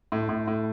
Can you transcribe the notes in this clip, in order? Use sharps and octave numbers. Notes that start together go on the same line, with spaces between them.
A2
A2
A2